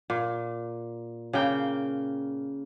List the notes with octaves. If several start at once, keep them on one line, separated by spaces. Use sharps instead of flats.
A#2
C#3 A#3 G5